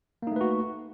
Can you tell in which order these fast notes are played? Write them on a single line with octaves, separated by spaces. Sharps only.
A#3 D#4 A3 B4 F#4